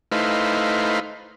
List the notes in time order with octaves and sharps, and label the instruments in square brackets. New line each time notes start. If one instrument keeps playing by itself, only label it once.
[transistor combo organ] A3 D#4 E4 B4 C5 F5